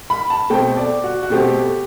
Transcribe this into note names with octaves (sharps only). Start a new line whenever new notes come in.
B5
A5
B2 A3 C4 G5
D5
F#4
F#4
B2 A3 C4 G4